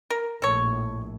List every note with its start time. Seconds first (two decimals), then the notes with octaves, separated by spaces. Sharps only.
0.10 A#4
0.42 A#1 A2 A4 C#5